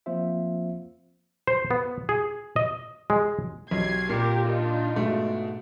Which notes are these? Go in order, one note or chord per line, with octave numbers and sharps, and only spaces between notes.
F3 A#3 C4 F4 C5 E5
C5
B3
G#4
D#5
G#3
B1 C3 G#6 C7
A#2 G4 A#4
D4 D#4 F4
G#2 B2 A3